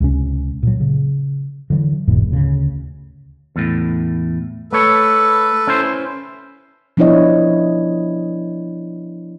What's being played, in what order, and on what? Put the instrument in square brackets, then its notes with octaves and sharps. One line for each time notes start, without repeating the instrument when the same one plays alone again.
[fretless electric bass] C#2 C3 C#4
A#2 F#3
C#3
D3 E3 F#3
F#1 E2 G#2 B2
D2 C#3
[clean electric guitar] E2 A2
[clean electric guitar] A3 C#5 [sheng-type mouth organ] A4 B4
[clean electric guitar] C#4 E4 C5
[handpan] F3 B3 D4 E4 C#5 D#5